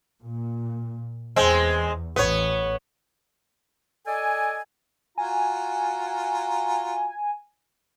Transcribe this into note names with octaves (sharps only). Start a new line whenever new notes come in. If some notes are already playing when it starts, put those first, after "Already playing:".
A#2
E2 G#3 C4
A1 B3 C#5
A4 D5 D#5 G#5
F4 F#4 G#5 A#5